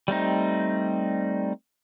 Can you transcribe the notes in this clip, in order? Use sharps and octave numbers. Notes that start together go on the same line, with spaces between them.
G3 A3 C4 D#4